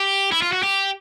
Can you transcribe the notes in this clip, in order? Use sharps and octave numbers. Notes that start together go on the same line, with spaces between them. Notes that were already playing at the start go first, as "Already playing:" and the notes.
Already playing: G4
E4
F4
F#4
G4